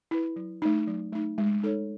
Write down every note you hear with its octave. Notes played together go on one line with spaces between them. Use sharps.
E4 B4
F#3
A3 D#4
F#3
A3 D#4
G#3
D#4 A4 C#5